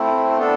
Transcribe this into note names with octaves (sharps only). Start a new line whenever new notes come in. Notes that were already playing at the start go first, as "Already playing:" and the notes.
Already playing: A3 C4 E4
B3 D4 A4